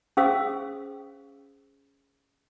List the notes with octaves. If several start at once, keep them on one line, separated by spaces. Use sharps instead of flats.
C#4 G#4 C5 F5 D#6 E6